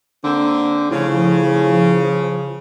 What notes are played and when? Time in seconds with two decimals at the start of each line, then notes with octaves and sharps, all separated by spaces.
0.24 D3 A#3 C4
0.90 A2 C#3 F3